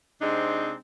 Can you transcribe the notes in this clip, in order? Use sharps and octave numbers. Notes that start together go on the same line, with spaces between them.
C3 G#3 C4 D4 D#4